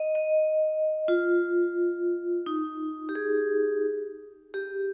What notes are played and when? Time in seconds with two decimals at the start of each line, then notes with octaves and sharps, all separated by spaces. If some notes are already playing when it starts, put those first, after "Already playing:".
Already playing: D#5
0.15 D#5
1.08 F4
2.46 D#4
3.09 G4
3.15 G#4
4.54 G4